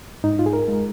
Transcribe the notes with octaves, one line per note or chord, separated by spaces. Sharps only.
G#2 D#4
F4
G#4
A#4
G#3